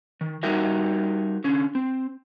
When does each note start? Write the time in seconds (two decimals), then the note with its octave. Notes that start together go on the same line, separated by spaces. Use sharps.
0.21 D#3
0.43 G3 D#4 F#4 G4 A#4 E5
1.44 D3 C#4
1.75 C4